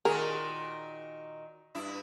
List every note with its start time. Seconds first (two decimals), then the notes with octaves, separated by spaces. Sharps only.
0.05 A#2 D#3 F#4 G#4 A#4
1.75 G2 E4